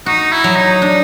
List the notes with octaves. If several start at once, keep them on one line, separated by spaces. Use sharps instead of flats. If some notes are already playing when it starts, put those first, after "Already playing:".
D#4 F#4
E4
F#3
D#4
D4